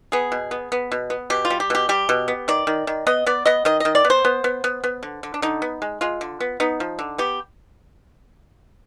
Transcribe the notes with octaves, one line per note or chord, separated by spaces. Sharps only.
B3 G#4
B2
B3
B3
B2
B3
B2 G4
F4
G3
G4
B2 G4
G3 G4
B2
B3
D#3 D5
D#3
D#3
B3 D#5
B3 D5
B3 D#5
D#3 D#5
D#3 D#5
D5
B3
C5
B3
B3
B3
B3
D3
D3
D4
D3 D#4
B3
G#3
G#3 F4
D3
B3
B3 D#4
F3
D3
B3 G4